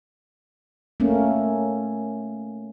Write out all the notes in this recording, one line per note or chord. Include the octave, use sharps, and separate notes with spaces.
A3 A#3 C#4